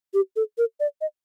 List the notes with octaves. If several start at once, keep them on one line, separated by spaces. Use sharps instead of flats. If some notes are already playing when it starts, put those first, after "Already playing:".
G4
A4
A#4
D5
D#5